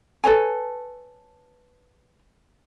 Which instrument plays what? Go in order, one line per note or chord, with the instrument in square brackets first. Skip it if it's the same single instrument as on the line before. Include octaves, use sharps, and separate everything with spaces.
[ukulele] A4 B4 C#5 G#5